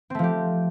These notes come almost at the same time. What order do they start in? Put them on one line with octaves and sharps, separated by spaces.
C4 A3 F3 G4